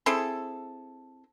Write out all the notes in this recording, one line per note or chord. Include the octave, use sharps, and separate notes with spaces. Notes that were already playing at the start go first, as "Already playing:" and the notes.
C4 E4 G#4 A4